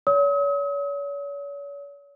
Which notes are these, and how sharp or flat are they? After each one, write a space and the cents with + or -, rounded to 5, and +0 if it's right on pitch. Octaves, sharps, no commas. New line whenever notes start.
C#5 +40 D#6 +45